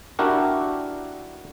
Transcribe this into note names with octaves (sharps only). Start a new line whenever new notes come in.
D4 E4 F#4 G4 A#4